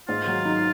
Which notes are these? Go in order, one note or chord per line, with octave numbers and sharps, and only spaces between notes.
G#2 F4
F#3
D#4